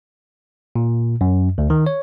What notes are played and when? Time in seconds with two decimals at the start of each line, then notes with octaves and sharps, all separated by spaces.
0.76 A#2
1.21 F#2
1.58 D2
1.70 D#3
1.86 C#5